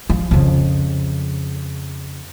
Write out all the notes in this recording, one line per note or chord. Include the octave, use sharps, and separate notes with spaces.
F3
F2 C#3